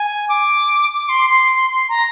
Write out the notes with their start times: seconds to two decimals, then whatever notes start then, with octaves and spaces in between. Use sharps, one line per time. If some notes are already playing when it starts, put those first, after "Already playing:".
Already playing: G#5
0.29 D6
0.93 D6
1.09 C6
1.25 C6
1.89 A#5